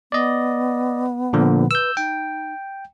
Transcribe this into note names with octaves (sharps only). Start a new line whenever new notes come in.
B3 D5 D#5
A#2 D3 F3
B4 E6 G6
D#4 G5